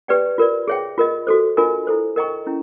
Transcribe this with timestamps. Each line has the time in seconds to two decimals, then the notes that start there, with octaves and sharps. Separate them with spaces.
0.08 G4 B4 D5 G5
0.38 F4 A#4 D5
0.68 G#4 C#5 E5 G5
0.98 F4 A#4 D#5
1.27 F#4 A4 C5
1.57 D4 F4 A#4 D#5 G#5
1.87 E4 A4 C5
2.16 A#4 D#5 G5 A#5 C#6
2.47 C#4 E4